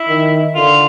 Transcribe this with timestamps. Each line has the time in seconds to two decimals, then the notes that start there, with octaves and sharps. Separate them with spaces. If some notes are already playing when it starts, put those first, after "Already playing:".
Already playing: E4
0.08 D#3
0.55 D3 F4